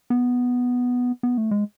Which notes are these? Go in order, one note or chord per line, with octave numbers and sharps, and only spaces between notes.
B3
B3
A3
G#3